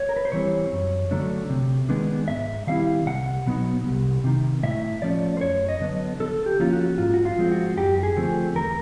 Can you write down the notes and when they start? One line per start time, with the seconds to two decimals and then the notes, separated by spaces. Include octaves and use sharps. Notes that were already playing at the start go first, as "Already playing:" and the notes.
Already playing: C#5
0.09 A#4
0.16 B4
0.25 C5
0.32 E3 G3 C4 C#5
0.72 F#2
1.11 D3 F#3 A3 D4
1.49 C3
1.89 D#3 G#3 B3 D4
2.28 G#2 E5
2.67 D#3 G3 C4 E4 F5
3.06 C2 F#5
3.46 B2 F#3 B3 D#4
3.86 C2
4.24 C3 D#3
4.63 A2 E5
5.02 F3 A3 C#4 D5
5.37 C5
5.41 F#2 C#5
5.69 D#5
5.81 D3 F#3 B3
6.20 D3 A4
6.46 G4
6.60 F3 A#3 C#4 F4
6.73 F#4
6.98 G#2 F4
7.14 F#4
7.25 F4
7.38 F3 G#3 C4
7.51 F#4
7.78 F#2 G4
7.98 G4
8.03 G#4
8.16 D3 F3 A3 C4
8.55 E2 A#4